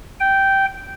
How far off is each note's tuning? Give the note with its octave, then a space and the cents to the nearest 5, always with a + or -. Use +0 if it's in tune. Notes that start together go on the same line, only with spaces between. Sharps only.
G5 -10